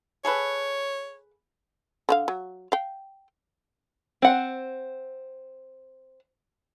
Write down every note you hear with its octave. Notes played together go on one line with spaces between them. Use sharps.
G#4 A4 B4 C#5
D3 F#4 F5
F#3
F5 G5
C4 F#5